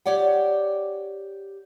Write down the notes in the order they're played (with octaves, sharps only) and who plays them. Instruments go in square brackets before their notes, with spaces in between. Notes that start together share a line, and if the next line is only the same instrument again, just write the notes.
[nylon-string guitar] G4 C#5 D5 F#5 G5